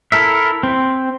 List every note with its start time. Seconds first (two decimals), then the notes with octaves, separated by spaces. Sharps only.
0.12 E4 A4 A#4 E5
0.63 C4